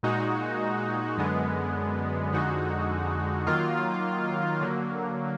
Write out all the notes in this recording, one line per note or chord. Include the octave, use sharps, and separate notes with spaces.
A#2 G#3 D#4 F#4
F#2 D3 G#3 B3
F2 D3 G#3 D#4 F#4
D#3 F#3 A#3 F4
D3 F#3 A#3